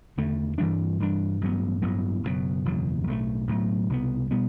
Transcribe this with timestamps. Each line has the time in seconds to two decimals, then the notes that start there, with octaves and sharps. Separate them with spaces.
0.17 E2 D3 A3
0.58 G2 E3 G3 D4
1.00 G2 E3 G3 D4
1.41 A1 G2 F#3 B3
1.82 A1 G2 F#3 B3
2.23 F#1 E2 B2 F#3
2.65 F#1 E2 B2 F#3
3.07 B1 A2 F#3 A3
3.47 B1 A2 F#3 A3
3.89 C2 B2 G3 B3
4.31 B2 G3 B3